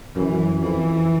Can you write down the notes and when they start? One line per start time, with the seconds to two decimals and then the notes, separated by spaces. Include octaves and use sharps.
0.15 F#2 E3
0.60 F2 E3